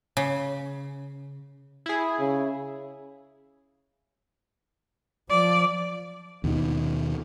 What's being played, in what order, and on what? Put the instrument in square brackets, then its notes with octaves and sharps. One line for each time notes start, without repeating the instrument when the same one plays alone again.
[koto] C#3
[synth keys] E4 G#4
[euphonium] C#3
[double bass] F3 [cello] D5
[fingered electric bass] D#2 B2 D#3